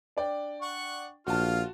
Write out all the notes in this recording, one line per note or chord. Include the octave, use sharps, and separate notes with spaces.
D4 D5 G5
F#5 C#6
A#1 F4 F#4 F5 A5